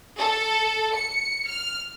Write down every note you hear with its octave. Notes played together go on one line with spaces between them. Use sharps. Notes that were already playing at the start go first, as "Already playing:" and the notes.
A4
C#7
F6